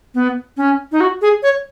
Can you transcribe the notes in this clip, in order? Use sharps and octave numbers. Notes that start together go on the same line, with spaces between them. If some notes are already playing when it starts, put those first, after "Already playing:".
B3
C#4
D#4
F#4
G#4
C#5